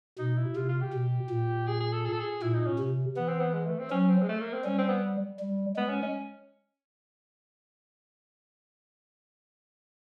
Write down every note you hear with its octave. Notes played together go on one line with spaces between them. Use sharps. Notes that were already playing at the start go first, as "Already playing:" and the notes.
B2 D#4
E4
C3 F4
F4
G4
B2
A#2
G#4
G#4
A4
G#4
A4
G#4
A#2 E4
D#4
C#4
C3
E3 B3
C4
B3
G#3
A3
C4
F#3 C#4
C4
G#3
A3
A#3
C4
G3 C#4
C4
B3
G3
G#3 B3
C#4
C#4